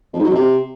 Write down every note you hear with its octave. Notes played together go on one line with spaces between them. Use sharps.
F2
G#2
F#3
F2
C3